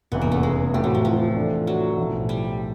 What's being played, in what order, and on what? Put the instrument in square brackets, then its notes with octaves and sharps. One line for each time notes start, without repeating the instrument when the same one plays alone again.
[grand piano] F1 E2 C#3 E3 [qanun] B3
[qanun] A#3
A3
G#3
[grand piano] A2 E3 A3 C4 [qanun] G3
[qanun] F#3
F3
F3
[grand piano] A2 E3 A3 D4
[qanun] F#3
[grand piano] B1 A2 F3
[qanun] G3